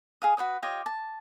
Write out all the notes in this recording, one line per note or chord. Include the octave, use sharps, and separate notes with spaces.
G#4 F5 D#6
F#4 B4 C#5 D#6
F4 G4 C#5 D#5
A5